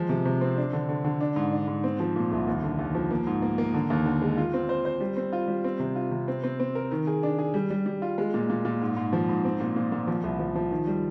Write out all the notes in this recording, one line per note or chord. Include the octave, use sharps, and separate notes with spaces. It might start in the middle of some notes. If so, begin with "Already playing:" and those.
Already playing: F3 G#3
C3
C3
C4
D4
D3
D3
D3
D4
G#2
D4
G#2
C4
F3
A#2
C2
D#2
D3
D#2
F3
A#3
G#2
A#3
A#3
D3
D#2
D3
G#3
F4
C4
C5
C5
G3
C4
F4
G3
C4
C3
F4
C3
C4
C4
C4
A#4
D#3
G#4
D4
G#4
G3
G3
G3
F4
G#3
A#2
A#2
A#2
G#2
G#2
F3
G#2
C4
A#2
A#2
A#2
F3
C2
F3
F3
D#3
G3